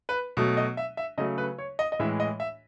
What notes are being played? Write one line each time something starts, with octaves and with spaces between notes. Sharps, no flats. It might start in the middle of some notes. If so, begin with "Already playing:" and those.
B4
B2 F#3 A3
D#5
E5
E5
C#3 F#3 A3 D#5
B4
C#5
D#5
D#5
A2 E3 G#3 E5
D#5
E5